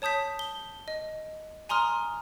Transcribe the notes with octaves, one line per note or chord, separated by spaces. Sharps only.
C#5 A5 D#6 G6 B6
G7
D#5
G#5 A#5 C6 D#6 F6